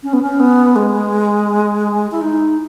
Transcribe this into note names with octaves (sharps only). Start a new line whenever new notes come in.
C#4
B3
C#4
B3
G#3
E4
D#4